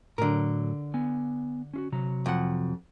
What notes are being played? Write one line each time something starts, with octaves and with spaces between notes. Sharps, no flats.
A2 D3 F#3 A#4
B3 G#5
C#4 F4 F#4
C3 F#3 A#5
F2 F#5